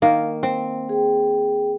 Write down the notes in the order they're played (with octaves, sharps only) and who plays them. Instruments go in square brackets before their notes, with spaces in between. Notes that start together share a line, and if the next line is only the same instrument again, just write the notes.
[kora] D#3 A#3
C4
[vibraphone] G#4 G5